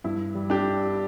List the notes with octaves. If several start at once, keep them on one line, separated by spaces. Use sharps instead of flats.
G2 E4
G3
D4 G4